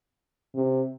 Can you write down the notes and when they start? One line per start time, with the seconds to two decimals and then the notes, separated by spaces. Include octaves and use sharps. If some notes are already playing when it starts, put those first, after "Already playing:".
0.54 C3